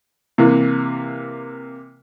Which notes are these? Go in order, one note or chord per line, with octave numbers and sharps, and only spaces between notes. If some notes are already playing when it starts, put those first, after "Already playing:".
C3 E3 A#3